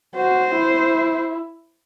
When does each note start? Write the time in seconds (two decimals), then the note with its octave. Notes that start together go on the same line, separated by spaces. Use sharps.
0.15 F#4 C5
0.54 E4